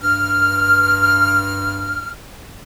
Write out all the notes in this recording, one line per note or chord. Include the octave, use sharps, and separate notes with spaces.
G2 F6